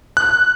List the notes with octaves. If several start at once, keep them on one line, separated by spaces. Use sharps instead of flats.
F#6